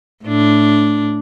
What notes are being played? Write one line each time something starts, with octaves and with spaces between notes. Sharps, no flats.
A2 D4